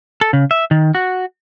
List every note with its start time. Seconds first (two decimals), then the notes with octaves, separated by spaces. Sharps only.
0.21 A4
0.33 C#3
0.51 E5
0.71 D#3
0.95 F#4